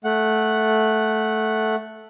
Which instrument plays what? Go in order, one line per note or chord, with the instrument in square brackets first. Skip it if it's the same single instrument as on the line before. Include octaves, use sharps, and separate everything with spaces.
[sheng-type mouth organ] A3 F#5